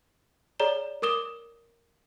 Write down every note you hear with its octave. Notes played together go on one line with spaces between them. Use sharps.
G#4 C#5 D5 A#5 E7 G7
A#4 D6 D#6 E7 G7